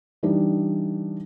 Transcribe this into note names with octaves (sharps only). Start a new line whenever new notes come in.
E3 G3 D4 D#4